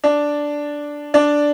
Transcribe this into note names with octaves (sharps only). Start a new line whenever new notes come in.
D4 D5
D4 D5